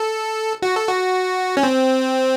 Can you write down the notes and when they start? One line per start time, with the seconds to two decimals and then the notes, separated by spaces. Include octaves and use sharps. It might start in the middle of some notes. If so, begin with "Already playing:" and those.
Already playing: A4
0.62 F#4
0.76 A4
0.88 F#4
1.57 C#4
1.63 C4